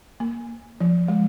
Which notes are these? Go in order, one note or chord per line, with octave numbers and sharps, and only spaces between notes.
A#3
F3
G#3